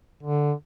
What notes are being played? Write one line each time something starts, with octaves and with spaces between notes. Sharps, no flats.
D3